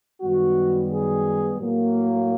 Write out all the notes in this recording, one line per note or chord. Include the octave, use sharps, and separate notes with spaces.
F#2 D#3 G3 B3 F#4
G#4
A2 F#3 A#3